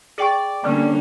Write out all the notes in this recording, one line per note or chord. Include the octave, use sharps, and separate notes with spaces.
G#4 D5 G5 C#6
D3 G3 A#3 C#4 D4